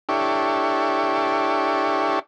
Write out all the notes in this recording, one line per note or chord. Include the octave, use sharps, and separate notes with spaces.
D4 E4 G4 A4 C#5